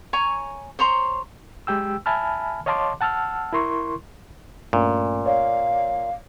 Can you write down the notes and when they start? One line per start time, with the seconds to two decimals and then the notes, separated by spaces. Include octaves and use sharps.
0.13 C#5 G#5 A#5 C#6
0.79 C5 C#5 A#5 C6
1.67 G#3 G4 G5 E6
2.06 E5 G#5 A5 B5 F6
2.66 C#5 D#5 F5 A5 C6 D6
3.01 F#5 A5 E6 F6
3.53 E4 A#4 C6 C#6
4.73 G2 A#2 A3 C#4
5.26 C#5 D5 F5